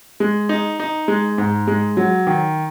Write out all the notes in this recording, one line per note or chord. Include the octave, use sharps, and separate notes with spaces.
G#3
D#4
D#4
G#3
G#2
G#3
F#3
D#3